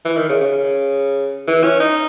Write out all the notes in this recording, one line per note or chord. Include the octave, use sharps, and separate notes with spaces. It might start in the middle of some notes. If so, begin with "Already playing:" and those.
E3
D#3
C#3
C#3
E3
C#4
D#4